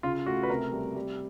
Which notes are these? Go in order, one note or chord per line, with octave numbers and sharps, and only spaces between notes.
C#3 F4
A3 F#4
B4
C3 A#4
G3
G3